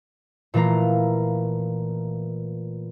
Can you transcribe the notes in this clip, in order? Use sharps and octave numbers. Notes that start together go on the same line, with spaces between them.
A#2 E3 A3 F4 A#5